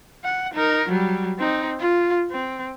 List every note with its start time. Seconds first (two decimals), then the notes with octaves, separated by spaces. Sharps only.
0.24 F#5
0.53 D#4 A#4
0.89 F#3 G3
1.39 C4 D#4
1.79 F4
2.31 C4